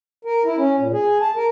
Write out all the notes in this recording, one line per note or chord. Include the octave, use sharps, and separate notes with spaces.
A#4
E4
C#4
A#2
G#4
A5
A#4